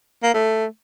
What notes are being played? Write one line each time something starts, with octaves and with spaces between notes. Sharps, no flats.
A#3
A3